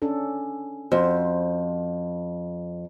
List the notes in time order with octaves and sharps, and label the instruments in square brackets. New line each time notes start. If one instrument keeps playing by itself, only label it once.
[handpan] C#4 D4 A4
[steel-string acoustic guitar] F2 [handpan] F#4 C5